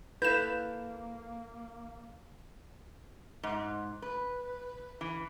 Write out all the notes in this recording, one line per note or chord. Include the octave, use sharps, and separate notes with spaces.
A#3 E4 A4 B4 F5 G6 E7
G#2
B4
E3